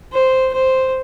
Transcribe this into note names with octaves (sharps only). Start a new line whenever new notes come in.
C5
C5